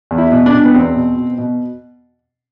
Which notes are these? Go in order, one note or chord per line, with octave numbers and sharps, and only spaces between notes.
E2
E4
B2
D4
B2
B3
E2 C4
B2
B2
B2